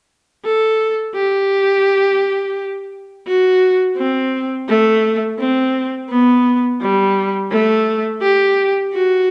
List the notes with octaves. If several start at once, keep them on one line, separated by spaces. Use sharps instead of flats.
A4
G4
F#4
C4
A3
C4
B3
G3
A3
G4
F#4